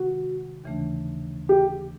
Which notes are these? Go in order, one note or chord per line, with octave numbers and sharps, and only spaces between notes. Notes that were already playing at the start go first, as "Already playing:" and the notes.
Already playing: C3 D#3 G#3 F#4
D#2 C#3 E3 A3 D4
G4